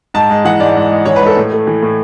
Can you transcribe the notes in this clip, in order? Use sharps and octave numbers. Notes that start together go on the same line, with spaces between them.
G#2 A5
G#3
E3 F#5
G#2 D5
G#2
G#3
E3 C#5
B4
G#2
A4
A2
A3
E3
A2